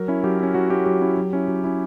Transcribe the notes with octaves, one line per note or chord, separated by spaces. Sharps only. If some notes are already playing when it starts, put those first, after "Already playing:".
Already playing: F#3 A#4
C#4 E4
F#3 G4
C#4 E4
F#3 F#4
C#4 E4 G4
F#3 G4
C#4 E4
F#3
C#4 E4
F#3
C#4 E4